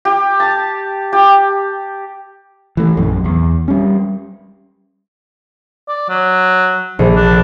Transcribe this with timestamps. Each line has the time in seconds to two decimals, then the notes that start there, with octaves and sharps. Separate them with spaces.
0.05 G4
0.40 A5
1.13 G4
2.77 E3 A3
2.97 A#1 F#2
3.24 E2
3.68 G3 C#4
5.88 D5
6.09 F#3
6.99 A#1
7.16 D4